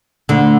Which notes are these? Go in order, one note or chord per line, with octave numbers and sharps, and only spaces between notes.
D2 D3